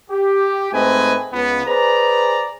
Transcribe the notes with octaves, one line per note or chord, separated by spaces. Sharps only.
G4
G#2 A3 C4 B4 D#5 G#5
C#2 B3
G#4 B4 C5 D5 A#5